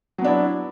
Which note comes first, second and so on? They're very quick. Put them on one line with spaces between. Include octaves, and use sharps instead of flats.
F#3 B3 D4 E4